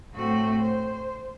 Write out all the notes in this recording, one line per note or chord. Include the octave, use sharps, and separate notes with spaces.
A2 A3 C4 F#4
C5